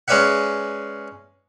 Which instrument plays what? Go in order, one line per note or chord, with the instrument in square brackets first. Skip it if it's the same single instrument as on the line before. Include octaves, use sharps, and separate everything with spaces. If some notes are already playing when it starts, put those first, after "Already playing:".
[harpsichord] G#3 C#4 B4 D5 E5 F#5